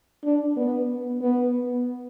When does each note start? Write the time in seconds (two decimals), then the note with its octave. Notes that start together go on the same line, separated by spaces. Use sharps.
0.24 D4
0.56 B3
1.21 B3